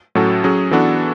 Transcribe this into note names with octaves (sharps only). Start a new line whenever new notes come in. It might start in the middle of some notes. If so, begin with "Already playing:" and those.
A2 F#3 C#4 F#4 A4
F#3 C#4 G#4
E3 B3 D4 F#4 A4